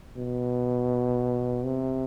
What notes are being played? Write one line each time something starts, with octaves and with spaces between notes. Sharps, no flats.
B2
C3